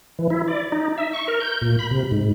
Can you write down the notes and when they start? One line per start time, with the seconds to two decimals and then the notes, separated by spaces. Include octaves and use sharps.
0.19 E3
0.30 E4
0.48 D5
0.72 D#4
0.98 E5
1.13 C#6
1.28 A#4
1.40 G6
1.62 A#2
1.79 B5
1.91 C3
2.11 G#2